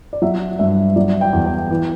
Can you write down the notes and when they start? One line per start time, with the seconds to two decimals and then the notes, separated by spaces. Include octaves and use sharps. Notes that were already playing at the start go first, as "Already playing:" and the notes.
0.13 D5
0.22 F#3 E5
0.59 G2 E5
0.96 F#3 D5
1.21 G5
1.33 E2
1.46 G5
1.70 E3